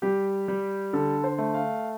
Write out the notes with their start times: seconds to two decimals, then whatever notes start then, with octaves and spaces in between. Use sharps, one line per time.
0.02 G3 G4
0.48 G3
0.93 D3 A4
1.24 C5
1.38 A3
1.54 F5